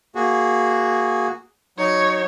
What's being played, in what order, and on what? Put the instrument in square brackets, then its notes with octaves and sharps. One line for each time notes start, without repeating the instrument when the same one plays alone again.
[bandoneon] A#3 F#4 G#4
[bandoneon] F#3 D#4 [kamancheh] C#5